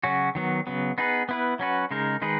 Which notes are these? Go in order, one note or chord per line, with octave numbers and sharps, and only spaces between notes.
C#3 F#3 C#4 F#4
D#3 F#3 B3
C#3 F#3 B3
B3 D#4 G#4 B4
B3 E4 B4
F#3 C#4 F#4 B4
C#3 G#3 D#4 A#4
D#3 G#3 D#4 G#4 B4